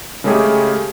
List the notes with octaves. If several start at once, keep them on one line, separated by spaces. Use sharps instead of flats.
C#3 G#3 A3 C#4 G4 G#4